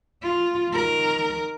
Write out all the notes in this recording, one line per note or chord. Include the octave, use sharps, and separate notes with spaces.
F4
D#3 A#4